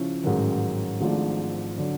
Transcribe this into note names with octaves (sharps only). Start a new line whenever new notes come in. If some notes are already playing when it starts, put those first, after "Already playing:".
Already playing: C#3 F3 C#4 E4
A1 G#2 D#3 F#3
G#1 G#2 F3 A3 D4
D3 F#3